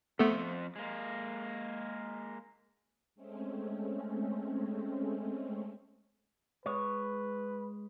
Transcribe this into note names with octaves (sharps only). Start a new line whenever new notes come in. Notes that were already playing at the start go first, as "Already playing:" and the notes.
F2 A3 B3 A4 C5
G#3 A#3
G#3 A3 C4 C#4
G#3 B4 C#5